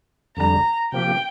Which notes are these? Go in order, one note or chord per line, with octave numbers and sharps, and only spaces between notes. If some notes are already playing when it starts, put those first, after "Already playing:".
F2 D3 G3 A#5
C3 F3 A#3 G4 G5